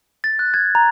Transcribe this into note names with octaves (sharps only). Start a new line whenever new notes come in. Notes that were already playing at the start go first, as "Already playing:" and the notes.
A6
F#6
G#6
A#5